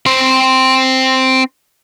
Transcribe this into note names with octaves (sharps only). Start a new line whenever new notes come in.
C4 C5